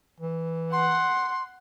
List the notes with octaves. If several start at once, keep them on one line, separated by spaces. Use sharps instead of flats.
E3
F#5 C6